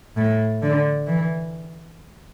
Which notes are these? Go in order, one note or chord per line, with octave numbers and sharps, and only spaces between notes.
A2
D3
E3